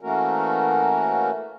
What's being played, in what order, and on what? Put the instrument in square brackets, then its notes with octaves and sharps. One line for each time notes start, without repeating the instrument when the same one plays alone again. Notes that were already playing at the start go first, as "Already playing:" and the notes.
[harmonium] E3 A3 A#3 C#4 F#4 A#4